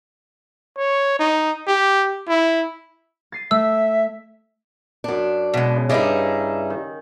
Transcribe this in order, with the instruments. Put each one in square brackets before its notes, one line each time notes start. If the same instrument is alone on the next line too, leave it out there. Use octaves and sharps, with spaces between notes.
[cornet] C#5
D#4
G4
E4
[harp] A6 C7 D#7
[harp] A3 [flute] E5 [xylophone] E6
[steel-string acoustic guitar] F#2 D4
[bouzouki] B2 G#3
[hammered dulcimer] C#3
[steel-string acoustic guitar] G2 G#4 [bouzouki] G3 D#4 E4
[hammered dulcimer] D#3